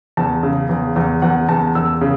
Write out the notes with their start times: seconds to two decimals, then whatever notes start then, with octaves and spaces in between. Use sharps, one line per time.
0.17 E2 A5
0.43 C#3
0.69 E2
0.96 E2
1.22 E2 F#5
1.49 E2 A5
1.75 E2 E6
2.01 C#3